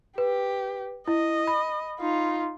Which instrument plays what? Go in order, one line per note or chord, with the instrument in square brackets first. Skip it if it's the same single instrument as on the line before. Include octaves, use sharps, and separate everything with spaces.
[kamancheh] G4 [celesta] B4
[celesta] E4 [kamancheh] D#5
[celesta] B5
[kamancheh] D#4 F4